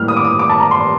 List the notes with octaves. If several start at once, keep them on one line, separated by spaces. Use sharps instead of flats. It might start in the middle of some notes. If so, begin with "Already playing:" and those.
Already playing: A2 G3 A#3 F6
D#6
D6
D#6
D6
A5
A#5
C6